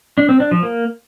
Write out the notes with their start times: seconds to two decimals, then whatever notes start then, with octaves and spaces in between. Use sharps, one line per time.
0.18 D4
0.29 C4
0.40 D4
0.51 F3
0.63 A#3